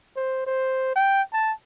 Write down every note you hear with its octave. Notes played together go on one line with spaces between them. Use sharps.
C5
C5
G5
A5